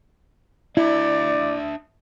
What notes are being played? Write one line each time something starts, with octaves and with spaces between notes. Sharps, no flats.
D4 E4 D5 E5